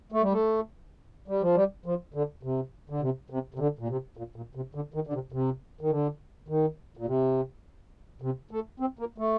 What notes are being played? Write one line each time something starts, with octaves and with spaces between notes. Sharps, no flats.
A3
G3
A3
G3
F3
G3
F3
D3
C3
D3
C3
C3
C3
D3
A#2
C3
A#2
A#2
C3
D3
D#3
D3
C3
C3
D#3
D3
D#3
A#2
C3
C3
A3
C4
A#3
A3